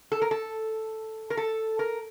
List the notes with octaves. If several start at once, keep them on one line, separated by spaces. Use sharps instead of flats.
A4
A#4
A4
A#4
A4
A#4